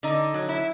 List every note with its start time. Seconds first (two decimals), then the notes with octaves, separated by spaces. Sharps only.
0.03 D3 D#4
0.34 F#3
0.49 E4